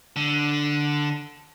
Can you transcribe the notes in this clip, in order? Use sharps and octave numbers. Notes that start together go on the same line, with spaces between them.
D3